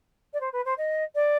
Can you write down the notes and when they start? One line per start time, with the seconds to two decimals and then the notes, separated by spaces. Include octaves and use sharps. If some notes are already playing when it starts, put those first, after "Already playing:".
0.33 D5
0.40 C5
0.53 B4
0.65 C5
0.77 D#5
1.15 D5